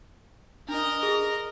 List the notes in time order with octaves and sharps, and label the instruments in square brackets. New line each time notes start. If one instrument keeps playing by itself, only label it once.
[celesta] D4 [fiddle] A#4 D#5
[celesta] G#4